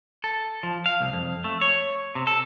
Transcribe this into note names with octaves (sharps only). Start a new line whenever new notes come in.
A4
F3
F5
C2
F2
A3
C#5
C3
A4